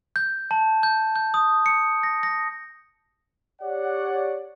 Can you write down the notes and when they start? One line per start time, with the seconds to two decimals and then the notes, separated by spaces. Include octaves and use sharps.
0.16 G6
0.51 A5
0.83 G6
1.16 G6
1.34 D#6
1.66 C#7
2.03 A#6
2.23 A#6
3.62 G4 C#5 D5 F#5